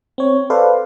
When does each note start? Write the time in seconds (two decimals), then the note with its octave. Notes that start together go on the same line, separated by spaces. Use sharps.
0.18 C4 C#5
0.50 A4 B4 C5 D5 F5